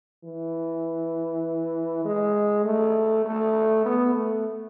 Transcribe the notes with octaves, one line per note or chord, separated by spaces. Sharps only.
E3
G#3
A3
A3
B3
A3